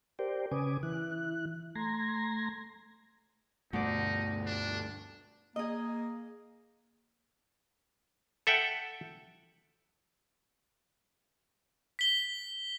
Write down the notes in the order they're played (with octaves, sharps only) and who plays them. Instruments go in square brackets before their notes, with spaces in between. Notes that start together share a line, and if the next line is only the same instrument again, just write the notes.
[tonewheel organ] G4 A#4 C5 D5 G5
C#3 C#4 B4 G#5 D6 D#6
E3 E4 F#6
A3 A#5 C6 G#6 A#6
[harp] D2 D5 [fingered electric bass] G2 B2 [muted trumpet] D#4
[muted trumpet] D4
[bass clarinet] A#3 [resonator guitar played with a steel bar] G#4 D#5
[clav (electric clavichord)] A4 E5 F#5 G5
[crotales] B6 G7